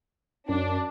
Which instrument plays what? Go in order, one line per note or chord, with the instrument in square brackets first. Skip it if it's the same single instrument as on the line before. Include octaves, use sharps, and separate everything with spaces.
[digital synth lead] F#2 [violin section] D4